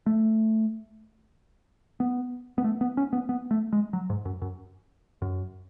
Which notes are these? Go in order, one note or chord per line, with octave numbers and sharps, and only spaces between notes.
A3
B3
B3
A3
B3
C#4
B3
B3
A3
G#3
F#3
G#2
F#2
F#2
F#2